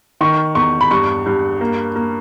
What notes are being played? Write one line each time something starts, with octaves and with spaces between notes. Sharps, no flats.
D#3 C#6
E2 C#6
B5
G2 C#6
G2
A#3
A#3